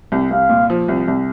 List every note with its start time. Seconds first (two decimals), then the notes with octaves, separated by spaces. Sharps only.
0.12 C2
0.30 C2 F5
0.49 A#2
0.70 F3
0.88 C2
1.08 C2